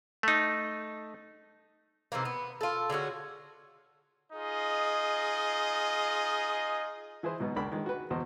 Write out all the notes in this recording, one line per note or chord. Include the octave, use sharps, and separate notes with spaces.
A3 D#4
C3 D#3 E3 A#3
B3
F4 A4
D3 G#3 C#4 F#4
D#4 F4 G#4 D#5
E3 E4 G#4 B4 C5
G#2 B2 F#3 B3 D#4
C#2 C#3 D4 A#4 B5
D#3 G#3
F#4 B4
E2 B2 C5 D#5